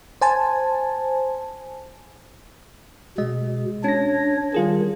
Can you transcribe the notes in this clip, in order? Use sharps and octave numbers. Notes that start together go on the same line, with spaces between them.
C5 G#5 A5
B2 G#3 D#5
C#4 D4 C#5 A#6
D#3 G3 F4 G#4